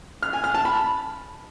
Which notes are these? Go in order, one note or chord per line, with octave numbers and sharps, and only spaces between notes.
F6
G#5
F6
A5
B5